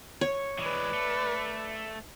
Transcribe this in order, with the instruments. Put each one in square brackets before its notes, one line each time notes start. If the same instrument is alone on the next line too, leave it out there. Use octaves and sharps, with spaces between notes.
[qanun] C#5
[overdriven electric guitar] E3 G#3 [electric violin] B4 D5
[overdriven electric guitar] A3